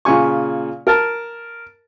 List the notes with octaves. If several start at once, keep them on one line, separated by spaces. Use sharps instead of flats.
A#2 C#3 G#5 C#6
A#4 A5